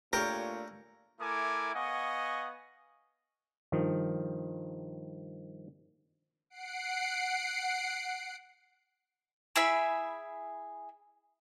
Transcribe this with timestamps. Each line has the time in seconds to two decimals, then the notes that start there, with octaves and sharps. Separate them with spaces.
0.13 A#2 A3 D4 G4 A#4 C#5
1.20 A3 E4 A#4 G#5 D6
1.74 B3 D#5 F5 F#5 G#5 C#6
3.72 G2 D#3 F3
6.50 F#5 C7 D7
9.56 E4 G#4 E5 B5